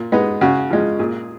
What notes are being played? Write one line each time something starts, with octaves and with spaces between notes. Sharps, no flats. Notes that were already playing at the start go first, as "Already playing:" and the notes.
Already playing: A#2
G#3 B3 D#4
C#3 F#4
F3 G#3
A#2 G#4